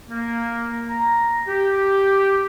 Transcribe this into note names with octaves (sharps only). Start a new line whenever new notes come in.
A#3
A#5
G4